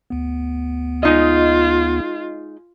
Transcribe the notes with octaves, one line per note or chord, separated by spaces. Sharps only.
D2 B3
G#3 D#4 F4 D#5